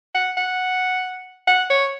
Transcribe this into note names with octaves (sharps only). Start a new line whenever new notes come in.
F#5
F#5
F#5
C#5